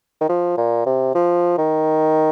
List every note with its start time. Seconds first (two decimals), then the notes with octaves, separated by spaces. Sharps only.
0.21 D#3
0.29 F3
0.57 A#2
0.86 C3
1.15 F3
1.58 D#3